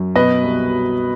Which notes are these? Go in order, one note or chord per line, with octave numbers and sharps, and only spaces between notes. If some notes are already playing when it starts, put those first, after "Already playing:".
Already playing: F#2
B2 B4 D#5
C2
F#3